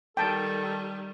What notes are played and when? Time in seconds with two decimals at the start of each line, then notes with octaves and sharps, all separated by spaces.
0.17 D#3 G3 A4 G5 A5